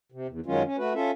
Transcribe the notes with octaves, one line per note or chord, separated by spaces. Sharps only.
C3
E2
F#2 D#3 F#3 G#3 C#4 F4
C#4
A3 F#4 B4
C#4 F4 A4 E5